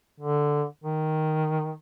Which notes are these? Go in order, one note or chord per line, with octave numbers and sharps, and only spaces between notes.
D3
D#3